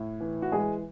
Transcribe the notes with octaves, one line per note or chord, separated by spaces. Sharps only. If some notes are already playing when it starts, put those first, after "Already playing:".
Already playing: A2
E3
F#4
E3 G#3 G#4